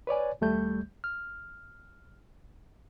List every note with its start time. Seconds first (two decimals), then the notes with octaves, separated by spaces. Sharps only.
0.07 B4 C#5 D5 G#5
0.41 D#2 G3 A3 G6
1.04 F6